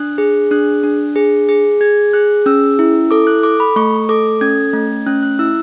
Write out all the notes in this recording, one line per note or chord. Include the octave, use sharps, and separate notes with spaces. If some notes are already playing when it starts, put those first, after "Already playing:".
Already playing: D4 F#6
G#4
D4 F#6
D4
G#4
G#4
G#4 G#6
G#4 F#6
C#4 E6
E4
A4 D6
F#6
A4 D6
B5
A3 C#6
A4 D6
C#4 G#6
A3
C#4 F#6
F#6
E4 E6